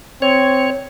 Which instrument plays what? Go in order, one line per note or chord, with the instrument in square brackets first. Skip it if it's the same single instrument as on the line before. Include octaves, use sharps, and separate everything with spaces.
[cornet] C4 [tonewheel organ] C#5